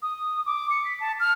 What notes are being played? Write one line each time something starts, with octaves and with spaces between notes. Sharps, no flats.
D#6
D6
C#7
B6
A5
F6